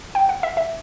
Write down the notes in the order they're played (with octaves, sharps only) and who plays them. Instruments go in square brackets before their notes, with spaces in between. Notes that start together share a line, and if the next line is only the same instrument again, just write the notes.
[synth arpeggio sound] G5
F#5
E5
E5